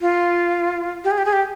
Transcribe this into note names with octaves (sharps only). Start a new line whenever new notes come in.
F4
G4
G#4
G4
G#4
G4